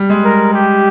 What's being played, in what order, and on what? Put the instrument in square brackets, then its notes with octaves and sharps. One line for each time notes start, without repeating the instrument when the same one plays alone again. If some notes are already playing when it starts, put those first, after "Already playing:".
Already playing: [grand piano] G3
G#3
[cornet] A#4
G4